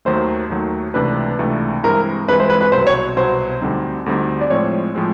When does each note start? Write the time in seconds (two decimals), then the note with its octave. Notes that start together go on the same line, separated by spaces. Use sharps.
0.05 D#2 D#3 F#3 A3 C5
0.50 D#2 D#3 F#3 A3
0.94 C#2 C3 E3 A3 D4 B4
1.39 C#2 C3 E3 A3 D4
1.83 G2 E3 G#3 C4 E4 A#4
2.28 G2 E3 G#3 C4 E4 B4
2.40 C5
2.50 B4
2.61 B4
2.72 C2 B2 F#3 C5
2.87 C#5
3.16 C2 B2 F#3 C5
3.61 D2 D3 G3 C4 D#4
4.06 D2 D3 G3 C4 D#4
4.41 D5
4.50 A2 F3 G#3 C4 C#5
4.95 A2 F3 G#3 C4